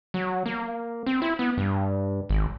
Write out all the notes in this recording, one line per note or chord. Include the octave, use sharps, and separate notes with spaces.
F#3
A#3
C4
E4
B3
G2
G#1